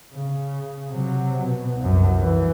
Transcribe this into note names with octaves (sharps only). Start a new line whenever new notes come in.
C#3
C3 F#3
B2
C2 F#2
E3